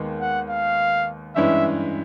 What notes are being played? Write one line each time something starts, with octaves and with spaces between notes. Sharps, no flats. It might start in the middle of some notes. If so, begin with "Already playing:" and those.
Already playing: D#2 D#3 G#3 B3
F#5
F5
G2 E3 G#3 C#4 E4 E5